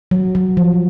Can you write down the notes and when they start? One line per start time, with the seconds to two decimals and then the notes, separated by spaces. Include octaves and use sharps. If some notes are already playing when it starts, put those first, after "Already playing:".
0.11 F#3
0.35 F#3
0.57 F3